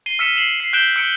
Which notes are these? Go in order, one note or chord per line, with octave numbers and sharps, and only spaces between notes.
C7 D#7 G7
E6 F6 B6 C#7 D#7 E7
C7 E7 F#7
C7
F#6 G6 D7 E7 F#7 G7
E6 F#6 C#7 D7